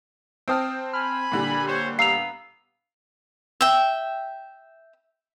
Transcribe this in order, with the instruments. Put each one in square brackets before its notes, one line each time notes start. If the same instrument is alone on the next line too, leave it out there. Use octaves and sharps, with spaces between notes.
[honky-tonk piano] C4 C5 A5 [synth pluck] G5 D#6 F6
[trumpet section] G#5 B5 [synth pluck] F6
[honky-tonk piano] A#2 D3 G3
[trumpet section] C5 C#5
[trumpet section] B3 [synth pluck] F5 A#5 E6 [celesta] C7 F7
[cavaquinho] E5 G5